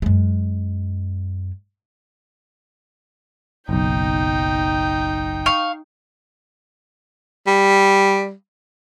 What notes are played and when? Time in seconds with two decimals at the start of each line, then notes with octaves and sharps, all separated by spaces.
0.02 F#2 G#3
3.69 F#1 B1 D#4 G5
5.46 F5 C#6
7.47 G3